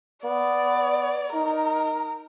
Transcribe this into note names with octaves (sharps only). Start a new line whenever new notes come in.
B3 D5
D#4 A#4